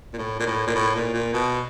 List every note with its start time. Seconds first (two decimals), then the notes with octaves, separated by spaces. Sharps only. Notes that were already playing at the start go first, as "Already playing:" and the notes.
0.13 A#2
0.18 A2
0.40 A#2
0.47 A2
0.67 A#2
0.75 A2
0.95 A#2
1.14 A#2
1.33 B2